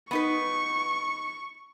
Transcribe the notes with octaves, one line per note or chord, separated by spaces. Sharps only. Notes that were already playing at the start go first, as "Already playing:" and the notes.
B3 D#4 B4 C#6